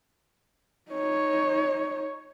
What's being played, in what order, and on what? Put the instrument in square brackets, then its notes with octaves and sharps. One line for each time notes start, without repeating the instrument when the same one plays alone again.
[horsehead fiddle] D#4 C#5